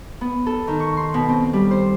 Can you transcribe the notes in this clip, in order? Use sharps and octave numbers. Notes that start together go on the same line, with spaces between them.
B3
A4
D#3
C#6
C6
B2
C4
G3
C5